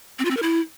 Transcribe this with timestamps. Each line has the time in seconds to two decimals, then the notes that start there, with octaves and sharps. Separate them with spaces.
0.19 C4
0.25 F4
0.31 C4
0.37 A#4
0.43 E4